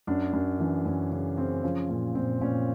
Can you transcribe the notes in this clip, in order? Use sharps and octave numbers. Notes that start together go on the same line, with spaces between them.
F#2 D4
F#2
E3 D4
F#2 C#4
C#3 C#4
C#3 C4
F3 C#4
A#2 C#4
A#2 C4
A#2 C#4